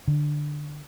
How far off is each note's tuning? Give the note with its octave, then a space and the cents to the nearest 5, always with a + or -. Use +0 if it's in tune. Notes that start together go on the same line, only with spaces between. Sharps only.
D3 +10